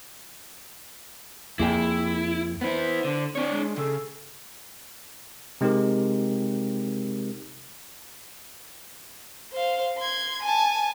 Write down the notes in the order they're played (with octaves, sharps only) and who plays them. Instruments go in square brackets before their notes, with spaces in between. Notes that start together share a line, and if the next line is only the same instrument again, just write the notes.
[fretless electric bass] F2 [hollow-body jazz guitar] A#3 G#4 G5 [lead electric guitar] E4
[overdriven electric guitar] B3 E4 [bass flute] C5
[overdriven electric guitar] D3
[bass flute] C4 [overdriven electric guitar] D4 C#5
[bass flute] G#3
[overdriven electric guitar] C#3 [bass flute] A4
[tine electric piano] C3 G#3 C4 D#4 G4 A#4
[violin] C5 F5
C6 G#6
G#5 A5